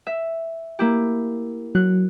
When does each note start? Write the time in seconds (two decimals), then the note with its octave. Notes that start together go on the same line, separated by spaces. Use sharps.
0.07 E5
0.79 A#3 E4 G4
1.75 F#3 F#6